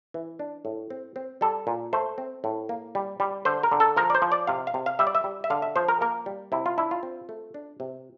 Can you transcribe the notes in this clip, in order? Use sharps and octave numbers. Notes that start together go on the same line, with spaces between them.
E3
D4
A2
C4
C4
G3 A4
A#2
A3 C5
C4
A2
A#3
G3
G3
D3 C5
A#4
D3
A4
F3 A#4
D5
C5
F3
D5
C3 F5
F5
C3
F5
G3 E5
D5
E5
G3
E5
D3 F5
E5
F3 C5
A#4
A#3 A#4
G3
C3 E4
F4
D4 E4
F4
C4
A3
D4
C3